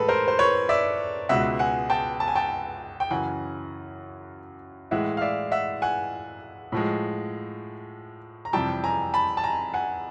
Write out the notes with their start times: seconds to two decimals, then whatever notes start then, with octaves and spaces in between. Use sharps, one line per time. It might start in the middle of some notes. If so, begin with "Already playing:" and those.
Already playing: A2 E3 G#3 A4 B4
0.09 A#4 C5
0.28 C5
0.39 B4 C#5
0.69 D5 E5
1.29 C#2 B2 G#3 E5 F#5
1.59 F#5 G#5
1.90 G5 A5
2.20 A5
2.28 G#5
2.35 G5 A5
3.00 G5
3.10 F#2 C#3 E3 F#5 G#5
4.91 A2 E3 G#3 E5 F#5
5.17 F5
5.21 D5 E5
5.51 E5 F#5
5.82 F#5 G#5
6.72 A2 F3 G#3
8.45 A#5
8.53 F2 C3 E3 G3 G5 A5
8.84 G#5 A#5
9.14 A5 B5
9.37 A5
9.43 G#5 A#5
9.74 F#5 G#5